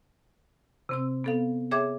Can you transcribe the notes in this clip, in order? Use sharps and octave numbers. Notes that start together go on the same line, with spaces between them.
C3 C4 E6
B3 A4 F5
G#4 C#5 E5 G5 D6 G#6